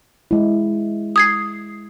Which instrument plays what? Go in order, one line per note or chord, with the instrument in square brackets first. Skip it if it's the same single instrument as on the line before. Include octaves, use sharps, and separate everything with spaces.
[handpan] G#3 E4
[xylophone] D#6 G#6 C7